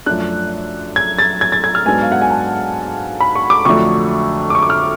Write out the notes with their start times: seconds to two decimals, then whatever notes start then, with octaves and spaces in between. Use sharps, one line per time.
0.06 F#2 F3 A3 D4 F#6
0.96 G#6
1.19 A6
1.41 G#6
1.52 A6
1.64 G#6
1.75 F6
1.86 G#2 F#3 B3 D4 G#5
2.02 F5
2.12 F#5
2.21 G#5
2.30 A5
3.20 B5
3.36 C#6
3.50 D6
3.65 F2 D3 F#3 A3 D4 C#6
4.50 D6
4.55 C#6
4.62 D6
4.70 F6